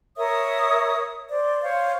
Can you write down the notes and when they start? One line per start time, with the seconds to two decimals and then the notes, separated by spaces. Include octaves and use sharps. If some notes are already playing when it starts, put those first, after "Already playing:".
0.16 A#4 C#5 E5 D#6
1.29 C5 D5
1.62 C5 C#5 F5